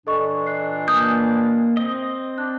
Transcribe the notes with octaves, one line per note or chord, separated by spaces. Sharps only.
A#2 E3 D4 A4 D#5 C#6
D#5 F#6 C7
A#3 D#6 G6
C4 D#5
D4 F#6